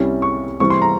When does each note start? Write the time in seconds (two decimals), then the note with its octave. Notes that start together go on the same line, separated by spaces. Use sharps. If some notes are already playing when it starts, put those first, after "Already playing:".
Already playing: C2 C3 G3 C#4 E4
0.22 C#6
0.60 C3 E3 G3 C4 C#6
0.70 C6
0.82 A#5